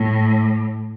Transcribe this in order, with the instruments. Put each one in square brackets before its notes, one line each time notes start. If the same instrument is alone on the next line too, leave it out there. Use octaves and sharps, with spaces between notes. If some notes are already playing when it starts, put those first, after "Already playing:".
Already playing: [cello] A2